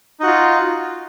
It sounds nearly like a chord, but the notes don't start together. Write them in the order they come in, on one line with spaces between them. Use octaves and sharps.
D#4 F#4 F4